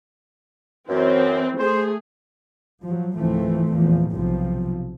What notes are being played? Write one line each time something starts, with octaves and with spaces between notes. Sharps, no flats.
F#2 E3 C4
A3 G#4 C5
F3 F#3
C#2 G#2 E3 F3 A3 C4
E2 A#2 E3 F3
B1 C3 F3